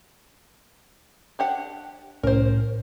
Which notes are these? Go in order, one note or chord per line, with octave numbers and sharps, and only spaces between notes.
D4 G4 F#5
C2 A2 C#4 A#4 C5